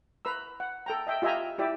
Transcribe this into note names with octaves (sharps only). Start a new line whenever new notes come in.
B4 A#5 E6
F#5
A4 G5 A#5
D#5 E5 G5
F4 G4 D#5 E5 G#5 A#5
E4 G4 D5 E5